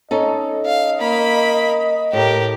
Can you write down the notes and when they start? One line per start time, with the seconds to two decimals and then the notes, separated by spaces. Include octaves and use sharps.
0.11 C#4 D#4 A4 D#5
0.66 F5
1.00 A#3 B5
2.13 A2 G4 A#4